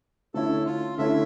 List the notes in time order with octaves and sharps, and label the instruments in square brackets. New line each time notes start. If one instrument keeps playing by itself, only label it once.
[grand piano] D3 A3 C#4 E4 [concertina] A4
[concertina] F4
[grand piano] D3 A3 C#4 E4 [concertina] E5